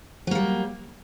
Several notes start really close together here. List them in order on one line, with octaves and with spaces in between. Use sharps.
F#3 A#3 G3